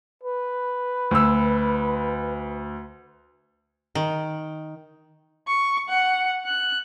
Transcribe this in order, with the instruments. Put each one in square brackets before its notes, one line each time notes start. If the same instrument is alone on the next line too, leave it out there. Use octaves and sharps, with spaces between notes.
[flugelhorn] B4
[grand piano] D2 E6
[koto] D#3
[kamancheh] C#6
F#5
F#6